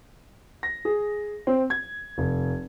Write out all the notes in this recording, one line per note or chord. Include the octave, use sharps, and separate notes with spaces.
A#6
G#4
C4
G#6
F1